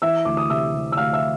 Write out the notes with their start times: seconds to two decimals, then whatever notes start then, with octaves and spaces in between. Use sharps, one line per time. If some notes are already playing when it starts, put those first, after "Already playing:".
0.02 E3 E5 E6
0.25 D2 D6
0.37 D#6
0.50 C3 E5 E6
0.74 C3
0.92 E6
0.97 D2 F5 F6
1.13 E5 E6